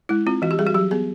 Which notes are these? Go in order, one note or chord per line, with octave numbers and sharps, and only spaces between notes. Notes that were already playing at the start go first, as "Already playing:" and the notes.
G#3 E4
C4 F4
E3 F#4
G4
G3 G#4
F#4
F#3 G4
B3 G#4